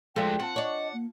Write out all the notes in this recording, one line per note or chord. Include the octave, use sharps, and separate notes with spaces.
F3 G#3 A3 F#4 A4 D5 E5 G5
C4 F4 F#5 A5
D4 C#5 D#5
A#3